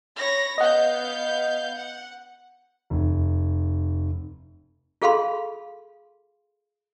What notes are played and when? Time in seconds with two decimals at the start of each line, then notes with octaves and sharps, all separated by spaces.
0.17 C#5 B5 A#6
0.58 B3 D#5 F5 F#5 G6
1.75 F#5
2.90 F1
5.02 F4 G#4 A4 F5 B5 C6